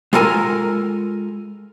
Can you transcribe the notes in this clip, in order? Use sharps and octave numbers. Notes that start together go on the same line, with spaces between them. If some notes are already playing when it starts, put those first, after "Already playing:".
G#3 F4 A4 A#4 G#5 A#5